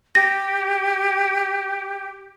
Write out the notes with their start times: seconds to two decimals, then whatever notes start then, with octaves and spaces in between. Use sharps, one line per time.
0.15 G4 A#6